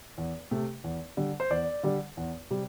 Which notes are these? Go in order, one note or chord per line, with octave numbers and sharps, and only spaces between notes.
E2
C3 A3
E2
D3 G3
C5
E2 D5
D3 G3
E2
C3 G3